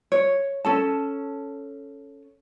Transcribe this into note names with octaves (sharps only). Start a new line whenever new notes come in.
C#5
C#4 A4 A5